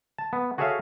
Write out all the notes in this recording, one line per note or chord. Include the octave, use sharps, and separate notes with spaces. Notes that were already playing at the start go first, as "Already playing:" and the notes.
A5
B3
F#4 G#4 A4 C#5 E5 F5